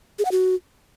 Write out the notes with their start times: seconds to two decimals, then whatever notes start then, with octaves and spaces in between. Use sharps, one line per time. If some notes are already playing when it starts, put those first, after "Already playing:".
0.19 G#4
0.25 F#5
0.31 F#4